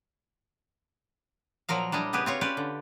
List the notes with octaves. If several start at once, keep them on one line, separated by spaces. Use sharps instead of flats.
A#2 F3 F#3 A#4 F5
G3 D4 E4 D#5
C#3 B3 G4 G#4 B4
C4 F4 C#5
C#4 G4 B4 D5
D3